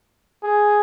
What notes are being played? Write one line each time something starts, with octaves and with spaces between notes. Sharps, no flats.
G#4